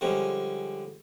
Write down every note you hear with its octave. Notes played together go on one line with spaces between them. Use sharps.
D3 F3 G3 G#3 C#4